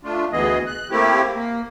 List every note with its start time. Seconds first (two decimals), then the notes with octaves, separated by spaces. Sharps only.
0.04 A3 D4 F4
0.32 D2 E3 B3 G#4 D#5
0.67 F#6
0.91 A3 A#3 C4 E4 G4
1.34 A#3